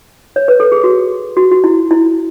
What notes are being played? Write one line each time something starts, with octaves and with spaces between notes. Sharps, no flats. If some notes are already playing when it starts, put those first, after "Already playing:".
C#5
B4
A4
G#4
F#4
F#4
F#4
E4
E4